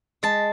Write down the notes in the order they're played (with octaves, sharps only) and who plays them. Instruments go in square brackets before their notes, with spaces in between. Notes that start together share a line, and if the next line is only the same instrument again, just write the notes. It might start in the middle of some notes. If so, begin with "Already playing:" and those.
[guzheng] G#3 [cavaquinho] A5